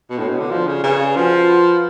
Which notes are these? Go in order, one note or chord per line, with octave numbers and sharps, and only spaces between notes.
B2
A2 D4 F#4 A4 C#5
B2
D3
F3 A4 D5 F5
C#3
C#3 G#4 B4 D5
F3 F#4 B4 F#5
B4 F#5 B5